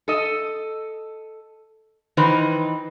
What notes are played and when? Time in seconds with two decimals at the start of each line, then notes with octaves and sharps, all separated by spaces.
0.08 A4 D#5
2.17 D#3 E3 D#4 B4 C5